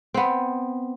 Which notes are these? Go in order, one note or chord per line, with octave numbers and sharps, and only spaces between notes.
B3 C4